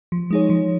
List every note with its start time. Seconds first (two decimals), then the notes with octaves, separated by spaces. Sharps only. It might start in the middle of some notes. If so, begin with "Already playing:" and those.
0.12 F3
0.31 G#3 D#4 G#4 C#5
0.50 F3